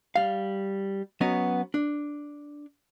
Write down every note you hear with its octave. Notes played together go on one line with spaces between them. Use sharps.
G3 F5
F#3 B3 C#4 D#5
D4